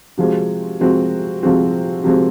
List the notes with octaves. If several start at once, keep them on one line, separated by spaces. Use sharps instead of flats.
C3 F3 G#3 C4 F#4
C3 F3 G#3 C4 F#4
C3 F3 G#3 C4 F#4
C3 F3 G#3 C4 F#4